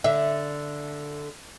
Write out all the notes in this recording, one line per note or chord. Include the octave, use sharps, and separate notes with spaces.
D3 E5